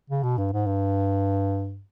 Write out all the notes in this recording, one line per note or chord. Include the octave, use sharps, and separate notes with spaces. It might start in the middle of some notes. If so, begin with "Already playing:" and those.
C#3
B2
G2
G#2
G2